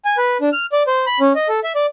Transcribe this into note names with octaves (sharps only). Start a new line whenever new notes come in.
G#5
B4
D4
F6
D5
C5
B5
C#4
D#5
A4
E5
D5